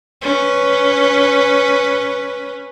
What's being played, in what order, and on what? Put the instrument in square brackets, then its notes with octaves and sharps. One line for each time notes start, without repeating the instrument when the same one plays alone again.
[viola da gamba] C#4 B4